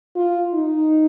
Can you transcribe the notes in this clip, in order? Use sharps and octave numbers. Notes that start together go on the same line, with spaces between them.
F4
D#4